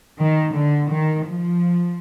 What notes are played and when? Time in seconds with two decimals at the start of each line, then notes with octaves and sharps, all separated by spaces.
0.19 D#3
0.55 D3
0.91 D#3
1.28 F3